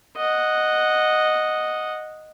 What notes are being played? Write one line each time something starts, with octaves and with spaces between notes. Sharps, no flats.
D#5 F#5